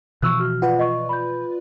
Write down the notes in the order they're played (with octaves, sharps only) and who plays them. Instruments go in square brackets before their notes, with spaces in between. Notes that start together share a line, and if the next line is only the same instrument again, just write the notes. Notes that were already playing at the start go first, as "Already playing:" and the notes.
[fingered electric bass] B2 E3 F3 [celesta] C#6 E6 F#6
[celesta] F#4 F6
[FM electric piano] F4 B4 D5 [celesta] F#5
[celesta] D#5 C#6
B5 G6